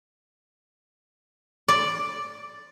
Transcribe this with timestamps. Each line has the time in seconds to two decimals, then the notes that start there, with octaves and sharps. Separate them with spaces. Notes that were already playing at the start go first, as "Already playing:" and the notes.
1.68 D5